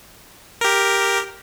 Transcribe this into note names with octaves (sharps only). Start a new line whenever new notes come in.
G4 A#4